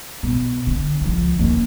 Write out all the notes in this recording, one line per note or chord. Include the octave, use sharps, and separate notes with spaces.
B2
D3
C#2 F3
D#2 C#4